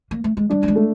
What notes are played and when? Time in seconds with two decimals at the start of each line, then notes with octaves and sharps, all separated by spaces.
0.11 A#3
0.24 A3
0.37 G#3
0.50 G3 D4
0.63 A3
0.68 G#3
0.76 A3